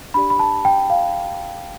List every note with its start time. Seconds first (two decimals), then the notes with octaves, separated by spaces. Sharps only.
0.14 D4 G4 D5 B5
0.30 B5
0.39 A5
0.65 G5
0.90 F5